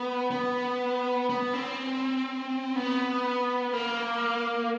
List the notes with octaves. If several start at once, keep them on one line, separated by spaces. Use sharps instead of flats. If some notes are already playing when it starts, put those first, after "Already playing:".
Already playing: B3
B3
B3
C4
B3
A#3